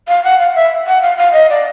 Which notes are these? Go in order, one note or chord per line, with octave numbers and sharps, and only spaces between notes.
F5
F#5
F5
E5
F#5
F5
F5
D#5
D5